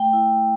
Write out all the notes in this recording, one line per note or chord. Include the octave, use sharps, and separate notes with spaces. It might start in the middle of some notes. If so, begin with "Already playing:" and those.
Already playing: A3 G5
E4